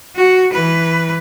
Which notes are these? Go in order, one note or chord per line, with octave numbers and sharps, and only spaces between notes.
F#4
E3 B4